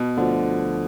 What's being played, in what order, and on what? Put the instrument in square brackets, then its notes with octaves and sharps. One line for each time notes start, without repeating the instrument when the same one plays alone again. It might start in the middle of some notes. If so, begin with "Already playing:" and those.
Already playing: [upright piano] B2
[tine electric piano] D2 D3 F3